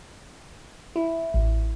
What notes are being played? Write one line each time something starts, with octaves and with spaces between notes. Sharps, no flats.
E4
A1